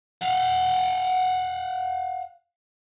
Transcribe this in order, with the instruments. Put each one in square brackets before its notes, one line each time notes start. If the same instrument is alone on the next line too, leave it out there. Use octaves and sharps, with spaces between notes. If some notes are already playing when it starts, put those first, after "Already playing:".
[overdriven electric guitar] F5 F#5